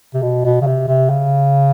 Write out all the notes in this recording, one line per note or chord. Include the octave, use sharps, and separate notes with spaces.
C3
B2
B2
C#3
C3
C3
C#3